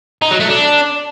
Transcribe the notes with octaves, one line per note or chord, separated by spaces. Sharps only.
D#4
F#3
A3
D4